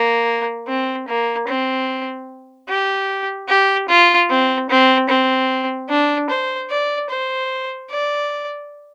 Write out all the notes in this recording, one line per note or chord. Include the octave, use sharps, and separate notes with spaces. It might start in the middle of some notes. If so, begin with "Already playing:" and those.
Already playing: A#3
C4
A#3
C4
G4
G4
F4
C4
C4
C4
D4
C5
D5
C5
D5